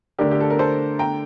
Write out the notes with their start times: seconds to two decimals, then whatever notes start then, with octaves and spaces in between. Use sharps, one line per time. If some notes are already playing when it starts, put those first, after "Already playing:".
0.18 D3 A3 D4 G4 A#4
0.31 G4
0.40 A4
0.50 A#4
0.59 A4 C5
0.99 G5 A#5